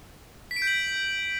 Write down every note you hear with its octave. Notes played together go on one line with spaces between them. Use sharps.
B6
D7
G6
F#7